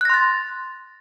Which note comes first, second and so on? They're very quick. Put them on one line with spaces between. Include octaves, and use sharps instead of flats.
F#6 A#6 C6 A6